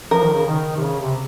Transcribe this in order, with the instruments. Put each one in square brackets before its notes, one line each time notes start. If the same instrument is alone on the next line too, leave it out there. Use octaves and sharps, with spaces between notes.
[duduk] F3 [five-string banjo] A#4
[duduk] D#3
C#3
D#3
C3
C#3
C3